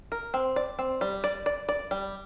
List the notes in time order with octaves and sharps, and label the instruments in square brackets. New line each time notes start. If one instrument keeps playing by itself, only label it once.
[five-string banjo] A#4
C4
D5
C4
G3
D5
D5
D5
G3